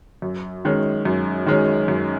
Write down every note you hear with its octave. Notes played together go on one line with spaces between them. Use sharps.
F#2
D#3 G#3 C#4
F#2
D#3 G#3 C#4
F#2